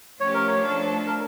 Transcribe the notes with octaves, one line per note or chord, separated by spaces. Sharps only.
F3 A3 C#4 G4 C#5
A#4
C#5
F3 A3 D4 A4
A#4